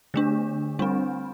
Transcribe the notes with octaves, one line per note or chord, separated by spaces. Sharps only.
D3 A3 D4
G3 C4 D4